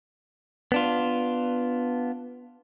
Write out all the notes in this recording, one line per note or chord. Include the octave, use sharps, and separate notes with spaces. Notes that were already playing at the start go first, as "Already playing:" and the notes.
B3 D4 F4